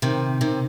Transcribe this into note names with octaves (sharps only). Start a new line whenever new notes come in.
C3 D#3
C3 D#3